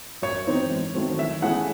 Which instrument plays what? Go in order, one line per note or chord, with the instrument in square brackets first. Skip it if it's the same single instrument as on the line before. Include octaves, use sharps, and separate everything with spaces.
[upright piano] F#2 [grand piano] C#5
[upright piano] E3 C4 D#4
G#2
D#3 F#3 A3 C4
[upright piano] E3 [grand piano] E5
[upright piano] A3 C#4 E4 G#4 [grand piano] F#5